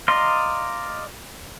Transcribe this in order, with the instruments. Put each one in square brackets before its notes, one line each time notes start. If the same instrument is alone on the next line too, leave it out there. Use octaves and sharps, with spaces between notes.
[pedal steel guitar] D5 D#5 F5 A#5 C6